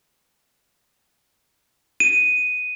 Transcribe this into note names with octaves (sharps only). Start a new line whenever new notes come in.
D#7